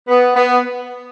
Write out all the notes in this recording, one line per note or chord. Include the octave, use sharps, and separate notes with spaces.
B3
B3